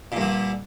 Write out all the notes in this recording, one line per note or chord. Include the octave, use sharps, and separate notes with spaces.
G2 A#2 D3